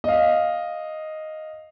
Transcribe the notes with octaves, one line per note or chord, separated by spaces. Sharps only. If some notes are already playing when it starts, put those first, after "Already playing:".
D#5 F5